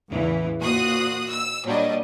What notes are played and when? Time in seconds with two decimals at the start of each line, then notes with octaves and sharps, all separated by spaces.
0.11 E2 A2 C#3 E3
0.60 A#2 F#4 C5 D#6 F#6 C7
1.29 E6
1.65 A#2 F#3 G3 D4 D#5